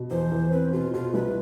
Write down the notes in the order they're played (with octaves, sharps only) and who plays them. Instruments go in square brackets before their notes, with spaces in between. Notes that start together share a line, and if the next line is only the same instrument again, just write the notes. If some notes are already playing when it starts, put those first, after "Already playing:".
Already playing: [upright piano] B2
[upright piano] E2 [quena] C5
[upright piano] E2
[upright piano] C4 [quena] B4
[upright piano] B2 [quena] F4
[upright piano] B2 [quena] F4
[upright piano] C2 [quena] B4